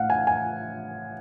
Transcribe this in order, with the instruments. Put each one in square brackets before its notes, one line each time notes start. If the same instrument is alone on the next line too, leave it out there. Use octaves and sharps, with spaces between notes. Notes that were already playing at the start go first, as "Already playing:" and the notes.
Already playing: [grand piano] A2 F5 F#5
G#5
G#5